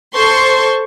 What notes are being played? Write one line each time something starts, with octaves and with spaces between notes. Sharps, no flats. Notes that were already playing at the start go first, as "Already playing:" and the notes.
A4 C5 C6 C#6